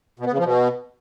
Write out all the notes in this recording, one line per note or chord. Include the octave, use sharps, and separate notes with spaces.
B2
B3
C#3
F3
B2